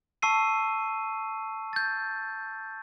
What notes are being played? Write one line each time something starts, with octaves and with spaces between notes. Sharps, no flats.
A5 C#6 E6 C7 D#7
G6 A6